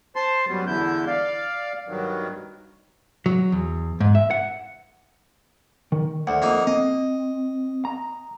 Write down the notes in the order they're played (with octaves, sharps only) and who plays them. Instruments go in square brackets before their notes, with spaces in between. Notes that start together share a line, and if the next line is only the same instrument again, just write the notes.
[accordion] C5 A5 C6
F#2 F#3 G3 B3
E2 D3 E4 G6
D5 F5
G2 D#3 F#3
[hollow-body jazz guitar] F#3
E2
G#2
E5
F#5
[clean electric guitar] D#3
[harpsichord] D2 [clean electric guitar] C5 F#5
[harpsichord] F2 A#3 D#4
[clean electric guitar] C4 [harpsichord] D#5
[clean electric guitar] A#5